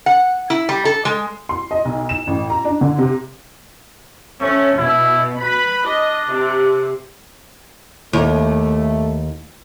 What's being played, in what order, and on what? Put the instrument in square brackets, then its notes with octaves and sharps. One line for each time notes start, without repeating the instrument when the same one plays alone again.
[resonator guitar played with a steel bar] F#5
E4
G3
A4
G#3
[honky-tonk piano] C6
D#5
B1
E7
A1
A#5
D4
D3
C3
[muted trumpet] A3 [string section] C#4
[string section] B2 [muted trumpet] E4
[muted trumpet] B4 [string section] B5
[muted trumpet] D4 [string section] D#5
[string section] C3
[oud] D#2 [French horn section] A3